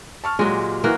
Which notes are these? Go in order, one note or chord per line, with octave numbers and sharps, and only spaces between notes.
A5 C#6 F6
A#2 F#3 G#3 G4
E3 A#3 F#4 F6